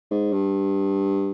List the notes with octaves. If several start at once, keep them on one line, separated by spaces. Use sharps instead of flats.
G#2
G2